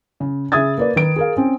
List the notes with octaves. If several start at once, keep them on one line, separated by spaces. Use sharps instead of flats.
C#3
C#3 G#4 E5 D#6 G#6 A6
A#3 B4 D5
D#3 B4 D7
G#4 A#4 F5
C4 C#4